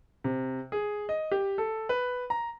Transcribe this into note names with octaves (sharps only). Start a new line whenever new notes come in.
C3
G#4
D#5
G4
A4
B4
A#5